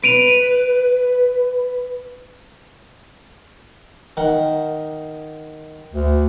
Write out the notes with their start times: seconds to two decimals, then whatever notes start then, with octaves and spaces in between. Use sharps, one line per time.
0.04 B4 D7 D#7 F7
4.17 D#3 F#5
5.93 D2